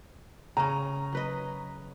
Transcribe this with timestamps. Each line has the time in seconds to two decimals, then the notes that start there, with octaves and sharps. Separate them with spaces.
0.57 C#3 C#4 A#5
1.13 F#3 B4 D#5